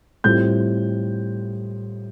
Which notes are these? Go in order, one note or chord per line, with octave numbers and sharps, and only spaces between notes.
A2 G3 C4 F4 G6